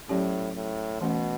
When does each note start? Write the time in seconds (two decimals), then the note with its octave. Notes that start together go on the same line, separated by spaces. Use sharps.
0.09 A2 F#3 C#4 G4
0.56 A2
1.01 B2 E3 A3 C#4